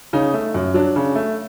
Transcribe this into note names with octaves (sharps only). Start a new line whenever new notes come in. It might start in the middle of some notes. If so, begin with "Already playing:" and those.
C#3 D#4
A3
F#2
F#3 D4
C#3
A3